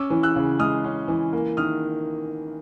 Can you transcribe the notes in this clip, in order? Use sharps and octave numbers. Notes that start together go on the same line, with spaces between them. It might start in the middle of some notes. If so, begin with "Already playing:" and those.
Already playing: C#4 D6 E6
E3
E6 F#6
C#3
G#3 D#6 F6
C#4
E3
A#3
D#3 D#6 F6